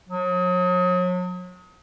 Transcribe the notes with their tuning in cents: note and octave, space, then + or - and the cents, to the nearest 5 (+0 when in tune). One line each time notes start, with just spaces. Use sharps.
F#3 -40